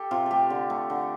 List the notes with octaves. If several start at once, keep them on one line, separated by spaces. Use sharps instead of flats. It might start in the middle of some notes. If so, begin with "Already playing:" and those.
Already playing: G4 A4
C3 F4
A3 G4 A4
D3
A3
D3